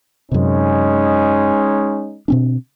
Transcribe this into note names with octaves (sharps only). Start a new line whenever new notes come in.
F#2 C3 G#3 C#4 D#4
B2 C4 D4